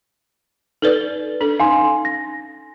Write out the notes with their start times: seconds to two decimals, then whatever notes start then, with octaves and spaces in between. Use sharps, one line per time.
0.82 D#4 A4 B4 D5
1.41 D4 A4
1.60 C#4 D#4 F5 G#5 C6
2.05 A#6